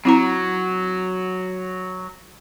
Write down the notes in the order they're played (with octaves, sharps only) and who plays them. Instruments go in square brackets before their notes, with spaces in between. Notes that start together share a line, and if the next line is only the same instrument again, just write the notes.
[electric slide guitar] F#3 [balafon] C4 E4 A#5